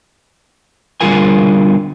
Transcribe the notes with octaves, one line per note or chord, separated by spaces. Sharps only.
D3 G3 F4 G#4 A#4 G#5